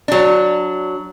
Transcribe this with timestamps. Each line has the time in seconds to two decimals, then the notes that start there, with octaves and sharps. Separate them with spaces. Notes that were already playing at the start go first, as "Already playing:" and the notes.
0.08 F#3 D4